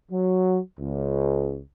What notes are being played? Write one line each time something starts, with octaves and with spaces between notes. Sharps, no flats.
F#3
C#2